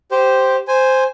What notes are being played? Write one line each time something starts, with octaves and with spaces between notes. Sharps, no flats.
G4 C5
C5 G#5